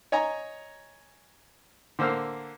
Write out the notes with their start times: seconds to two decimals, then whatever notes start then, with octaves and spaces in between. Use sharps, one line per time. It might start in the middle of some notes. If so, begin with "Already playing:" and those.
0.12 C#5 D#5 G#5 A#5
1.99 D3 A#3 C5 E6 F6